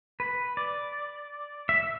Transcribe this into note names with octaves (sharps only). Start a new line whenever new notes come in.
B4
D5
E5